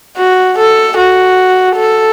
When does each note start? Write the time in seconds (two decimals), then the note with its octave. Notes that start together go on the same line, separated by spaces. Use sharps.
0.18 F#4
0.58 A4
0.97 F#4
1.77 A4